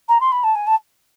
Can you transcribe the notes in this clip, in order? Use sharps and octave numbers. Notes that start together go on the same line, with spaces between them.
A#5
C6
B5
A5
G#5
A5